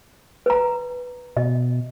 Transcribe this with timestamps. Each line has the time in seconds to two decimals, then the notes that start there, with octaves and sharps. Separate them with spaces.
0.46 B4 A#5
1.37 B2 D#5